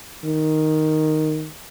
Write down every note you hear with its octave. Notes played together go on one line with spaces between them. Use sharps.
D#3